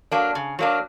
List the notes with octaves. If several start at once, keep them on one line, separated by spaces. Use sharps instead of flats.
F#3 A#3 D4
C#3
F#3 A#3 D4